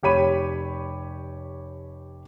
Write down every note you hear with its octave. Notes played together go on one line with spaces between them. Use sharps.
F1 G4 C#5 B5 D#7